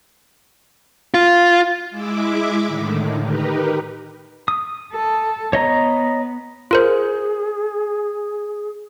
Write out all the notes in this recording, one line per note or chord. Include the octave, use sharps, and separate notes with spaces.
F4
G#3 E4 E5 D6
A2 D3 D#3
D#4 G4 A#4 B4
D#6
A4
B3 C#5 D#5 A#5
F4 G#4 A#4 C5